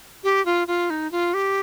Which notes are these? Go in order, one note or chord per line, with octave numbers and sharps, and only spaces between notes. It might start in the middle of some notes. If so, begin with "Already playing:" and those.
G4
F4
F4
D#4
F4
G4